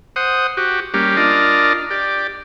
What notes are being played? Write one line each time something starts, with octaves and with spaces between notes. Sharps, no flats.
C5 F#5 D#6
F#4 G4
G3 A#3 C#4 G4
D4 F4 A#4 D5 D#5
G4 D5